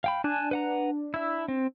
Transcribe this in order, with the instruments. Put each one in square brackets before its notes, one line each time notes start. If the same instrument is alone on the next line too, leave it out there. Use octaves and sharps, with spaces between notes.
[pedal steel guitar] F5 G5 B5
[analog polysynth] D4 [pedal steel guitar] G#5 A5 F#6
[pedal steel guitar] B4 F#5 A#5
E4 E5
C4